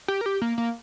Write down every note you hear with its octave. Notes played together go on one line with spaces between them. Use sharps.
G4
A#4
G4
A#3
A#3